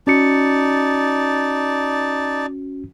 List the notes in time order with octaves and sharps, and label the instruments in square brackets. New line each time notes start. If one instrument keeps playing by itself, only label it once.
[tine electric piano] C#4 F#4 C#7 [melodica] D#4 D5 A5